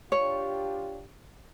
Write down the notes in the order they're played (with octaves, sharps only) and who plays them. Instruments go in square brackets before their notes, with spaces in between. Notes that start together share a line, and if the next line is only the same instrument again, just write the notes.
[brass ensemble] D4 F4 G4 [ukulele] C#5